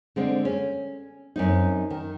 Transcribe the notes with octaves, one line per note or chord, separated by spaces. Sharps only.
D3 G#3 C4
C#4
F#2 C4 D#4
D#3